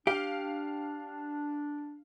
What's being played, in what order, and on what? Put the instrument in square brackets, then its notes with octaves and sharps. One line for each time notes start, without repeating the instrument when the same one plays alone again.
[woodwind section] D4 [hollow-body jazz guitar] G4 [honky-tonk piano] F5